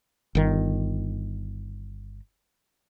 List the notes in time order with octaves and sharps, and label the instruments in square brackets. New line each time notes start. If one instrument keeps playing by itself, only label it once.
[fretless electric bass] G1 D#3